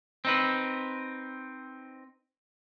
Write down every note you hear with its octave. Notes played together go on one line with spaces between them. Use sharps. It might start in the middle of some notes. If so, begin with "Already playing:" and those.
C4 D#4 B4